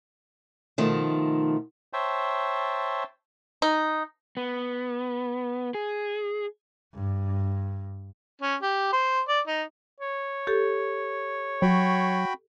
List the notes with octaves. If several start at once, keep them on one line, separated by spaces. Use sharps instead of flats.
B2 D#3 F3 A3
C5 C#5 E5 G5 A5
D#4
B3
G#4
G2
C#4
G4
C5
D5
D#4
C#5
G4 A4
F#3 F#4 G5 B5